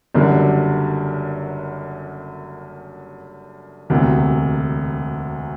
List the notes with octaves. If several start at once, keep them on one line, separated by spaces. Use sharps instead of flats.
F#1 F#2 D3 G3
E1 D2 C3